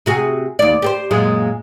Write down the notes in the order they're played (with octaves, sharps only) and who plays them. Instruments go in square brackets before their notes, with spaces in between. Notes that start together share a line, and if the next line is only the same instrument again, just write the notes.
[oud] C3 F#4 G#4
D#2 D5
G4 G#4 C5
F#2 A#2 G#3